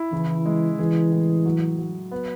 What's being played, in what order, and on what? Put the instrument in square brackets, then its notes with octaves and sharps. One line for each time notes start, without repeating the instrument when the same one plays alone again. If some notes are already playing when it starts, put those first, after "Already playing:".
Already playing: [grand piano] E4
[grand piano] C#3 [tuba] E3
[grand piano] G#3
[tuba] E3 [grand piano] G#4
[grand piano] A2
F#3
F#3
B3